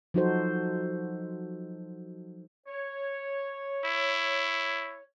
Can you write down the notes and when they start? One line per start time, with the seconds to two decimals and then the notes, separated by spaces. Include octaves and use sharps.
0.14 F3 F#3 D#4 F#4 A4 C5
2.67 C#5
3.84 E4